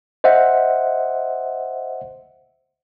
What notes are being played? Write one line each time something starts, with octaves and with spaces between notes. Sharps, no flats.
C5 D#5 E5 F#5